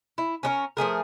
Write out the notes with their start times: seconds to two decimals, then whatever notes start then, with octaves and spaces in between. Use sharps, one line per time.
0.18 E4
0.43 C#4 D4 A#4
0.77 F3 A3 G#4 A#4